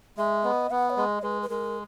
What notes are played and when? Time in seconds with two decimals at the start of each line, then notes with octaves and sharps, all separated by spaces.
0.17 G#3 E5
0.44 B3 D#5
0.71 B3 F#5
0.90 C#5
0.97 G#3 D#5
1.23 G#3 B4
1.42 B4
1.49 G#3 A#4